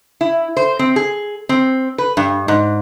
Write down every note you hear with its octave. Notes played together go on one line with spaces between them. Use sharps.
E4
C5
C4
G#4
C4
B4
G2
G#2